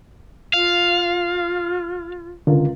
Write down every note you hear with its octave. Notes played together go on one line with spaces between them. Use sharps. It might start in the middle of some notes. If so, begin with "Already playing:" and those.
F4 F5
C#2 D3 F4 A#4